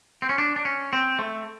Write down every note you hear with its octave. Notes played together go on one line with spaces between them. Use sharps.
C4
C#4
D4
D4
C#4
C4
A3